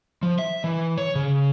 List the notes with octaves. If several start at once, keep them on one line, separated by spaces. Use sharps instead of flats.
F3
E5
E3
C#5
C#3